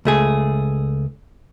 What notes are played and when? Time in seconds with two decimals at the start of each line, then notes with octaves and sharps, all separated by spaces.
0.05 C#2 A3 G#4